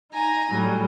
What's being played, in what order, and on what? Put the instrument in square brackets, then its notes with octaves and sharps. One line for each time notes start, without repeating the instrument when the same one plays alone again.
[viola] D#4 A#5 [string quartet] G#5
[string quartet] A2 [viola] F#3 G3